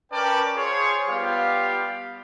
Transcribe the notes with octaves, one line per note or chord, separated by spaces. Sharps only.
C#4 A#4 B4 D5 G5 A5
F4 G#4 C5 C#5
G3 B3 F4 G4 F5